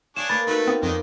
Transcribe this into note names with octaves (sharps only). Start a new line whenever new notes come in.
D4 G#4 C#5 F5 C6 E7
A#3 B4 B5 A6
A3 D#4 F#4 B4
B3 C4 F4
F2 D#3 B3 D4 A#4 D#5